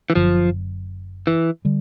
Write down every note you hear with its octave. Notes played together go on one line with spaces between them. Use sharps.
E3
F#1 F#2 D3 F3 F#3
E3
D3 G3